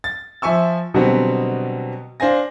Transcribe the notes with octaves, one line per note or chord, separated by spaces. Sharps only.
A6
F3 E5 G#5 C#6 E6
B2 D3 F#3 G3 B3 C4
D4 C5 F5 G#5 A#6